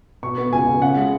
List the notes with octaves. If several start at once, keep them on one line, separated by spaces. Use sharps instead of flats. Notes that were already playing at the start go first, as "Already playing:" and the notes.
B2 C#6
B3
C#2 G#5
C#2
C#3 F#5
G#3